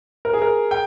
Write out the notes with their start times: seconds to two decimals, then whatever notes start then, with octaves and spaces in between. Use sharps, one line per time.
0.25 A#4
0.33 G#4
0.42 A#4
0.71 G5